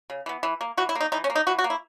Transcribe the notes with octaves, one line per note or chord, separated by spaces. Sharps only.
C#3
E3 B3
E3
A#3
E3 F#4
E4
A#3
D#4
E3 D#4
C#4
A#3
D#4
E3 F#4
F#4
A#3
E4